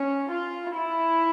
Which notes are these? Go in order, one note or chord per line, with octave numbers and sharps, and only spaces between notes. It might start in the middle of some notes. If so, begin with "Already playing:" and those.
Already playing: C#4
F4
E4